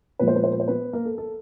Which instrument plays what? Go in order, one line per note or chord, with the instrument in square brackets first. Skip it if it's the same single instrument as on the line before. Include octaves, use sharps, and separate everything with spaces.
[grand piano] A#2 F3 G#3 B3 B4
C5
B4
C5
B4
C5
B3 B4
A#3 A#4
A4
A4